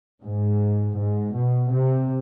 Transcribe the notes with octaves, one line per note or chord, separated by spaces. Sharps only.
G#2
G#2
B2
C3